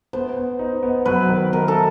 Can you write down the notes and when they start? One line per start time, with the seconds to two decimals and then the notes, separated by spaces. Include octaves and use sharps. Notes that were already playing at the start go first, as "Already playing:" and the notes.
0.13 B3 C5
0.37 B3
0.59 D#4
0.83 B3
1.06 F#3 B4
1.29 D#3
1.53 D#3 A#4
1.68 A4